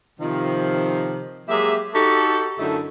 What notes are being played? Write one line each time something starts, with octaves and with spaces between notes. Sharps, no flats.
C3 D#3 F3
F#3 G#3 A#3 G4 E5
D#4 F#4 G4 A4
F#2 D3 F#3 A3 D#4 E4